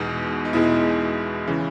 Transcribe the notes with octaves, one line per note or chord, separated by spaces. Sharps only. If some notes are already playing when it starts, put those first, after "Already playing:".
Already playing: E2 B2 G#3 D#4
D#4
E2 B2 G#3 E4
C#3 E3